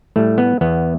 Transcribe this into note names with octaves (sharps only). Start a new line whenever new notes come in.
A2 G3 A3
B3
E2 B3